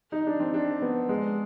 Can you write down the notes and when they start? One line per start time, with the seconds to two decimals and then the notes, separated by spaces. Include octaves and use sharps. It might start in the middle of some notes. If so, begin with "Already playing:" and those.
0.12 D#4
0.27 D4
0.40 C4
0.54 D4
0.82 B3
1.09 G#3